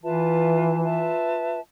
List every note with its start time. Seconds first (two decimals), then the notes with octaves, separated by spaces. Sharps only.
0.03 E3 F4 B4 E5 A5
0.81 F4 B4 E5 A5